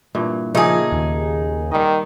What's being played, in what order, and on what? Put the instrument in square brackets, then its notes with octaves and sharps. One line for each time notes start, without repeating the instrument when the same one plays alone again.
[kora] G2 A#2 E3
[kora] A#2 C#3 A3 [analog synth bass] F3 [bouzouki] D#4 G#4
[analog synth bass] D#2
[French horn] D#3 [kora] G3 D#5